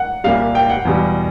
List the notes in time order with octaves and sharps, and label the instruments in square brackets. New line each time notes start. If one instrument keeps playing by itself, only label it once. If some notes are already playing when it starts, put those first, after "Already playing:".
Already playing: [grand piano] F#5
[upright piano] C2 A#2 G3 [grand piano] F5
[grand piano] G5
F#5
[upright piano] E2 B2 G3